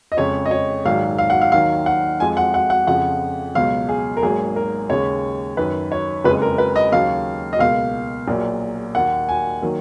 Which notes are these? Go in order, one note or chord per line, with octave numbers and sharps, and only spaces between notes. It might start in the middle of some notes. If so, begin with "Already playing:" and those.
D#5
F2 C#3 G#3 C#5
D#5
C#5
A#1 G#2 D#3 F#3 F5
F5
F#5
F5
D#2 D#3 F#3 F5
F#5
F2 F3 G#3 G#5
F#5
F#5
F#5
F2 C#3 F3 F#5
C#2 B2 F#3 F5
G#4
A#4
G#1 G#2 F#3 A#3 G#4
A#4
D#2 C#3 G#3 C#5
F#2 D#3 F#3 B4
C#5
F#1 F2 C#3 G#3 B4
A#4
B4
D#5
D#2 C#3 F#3 F5
D#5
C#2 B2 A#3 F5
A#1 A#2 F#3 A#3
D#2 D#3 A#3 F#5
G#5
D#3 F#3 A#3